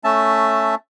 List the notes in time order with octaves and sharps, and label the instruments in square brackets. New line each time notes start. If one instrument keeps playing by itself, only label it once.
[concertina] A3 C#4 E5 A5